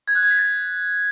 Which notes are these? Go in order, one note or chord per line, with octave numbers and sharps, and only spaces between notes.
G#6
F#6
G#6
B6
A6